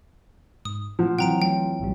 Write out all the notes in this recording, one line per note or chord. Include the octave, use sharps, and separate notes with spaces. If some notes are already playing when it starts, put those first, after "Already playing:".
G#2 D#6
A2 F3 F#5
E3 F#3 C4 F#5 G5 A#5 D7
F#3 A3 F4 G5
B1 A2 G3